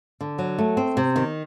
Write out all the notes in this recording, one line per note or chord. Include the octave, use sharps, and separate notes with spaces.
D3
F#3
A3
C4
C3
D#3